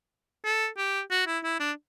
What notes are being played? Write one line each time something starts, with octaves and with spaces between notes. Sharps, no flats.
A4
G4
F#4
E4
E4
D4